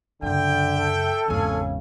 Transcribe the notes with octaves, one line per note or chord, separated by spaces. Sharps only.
C#2 F#2 D3 E5 G5
A4
G#1 E2 C#3 C#4 G#4 G#5